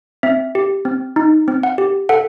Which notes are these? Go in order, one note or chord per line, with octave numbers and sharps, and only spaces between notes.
C4 E5
G4
C4
D#4
C4
F#5
G4
A4 F#5